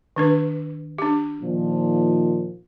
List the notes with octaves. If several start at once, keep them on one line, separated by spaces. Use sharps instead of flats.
D#3 D4 B4
D4 G4
A#2 D#3 F3